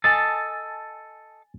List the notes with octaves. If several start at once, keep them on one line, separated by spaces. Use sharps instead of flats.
A4 D#5 G#5 A5 A6